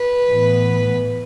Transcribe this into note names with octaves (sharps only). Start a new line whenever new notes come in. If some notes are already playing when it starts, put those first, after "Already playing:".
Already playing: B4
A2 E3 B3